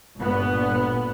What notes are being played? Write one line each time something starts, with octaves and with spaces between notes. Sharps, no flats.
G1 A#2 B3